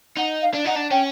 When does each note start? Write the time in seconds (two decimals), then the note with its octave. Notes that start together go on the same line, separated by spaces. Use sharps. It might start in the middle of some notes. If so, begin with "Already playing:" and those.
0.17 D#4 F#5
0.42 F5
0.54 D4
0.65 D#4 F#5
0.76 D4
0.91 C#4 G5